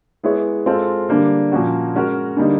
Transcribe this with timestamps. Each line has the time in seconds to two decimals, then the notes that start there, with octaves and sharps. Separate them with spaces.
0.23 G#3 B3 E4 G#4 C#5
0.66 G#3 C4 F4 A4
1.09 D3 G3 A#3 D4
1.52 A#2 F3 A#3 C#4 F#4
1.95 G#3 C#4 F#4 A#4
2.37 D3 G3 A#3 D#4